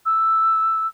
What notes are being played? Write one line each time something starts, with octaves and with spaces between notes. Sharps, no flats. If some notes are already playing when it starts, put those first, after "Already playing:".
E6